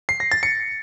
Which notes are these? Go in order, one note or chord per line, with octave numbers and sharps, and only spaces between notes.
C7
A#6
A6
C#7